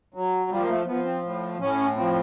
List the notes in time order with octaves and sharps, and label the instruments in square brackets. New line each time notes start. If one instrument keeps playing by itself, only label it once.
[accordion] F#3
F3 G3
A#3
A3
F3 B3
C4
A2
A2 C#4
F3 C4